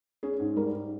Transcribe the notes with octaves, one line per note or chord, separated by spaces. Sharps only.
C#4 G#4
G#2
G3 A#4
G#2